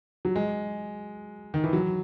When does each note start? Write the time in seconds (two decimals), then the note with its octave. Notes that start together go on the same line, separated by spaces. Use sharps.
0.25 F#3
0.36 G#3
1.54 D#3
1.64 E3
1.73 F#3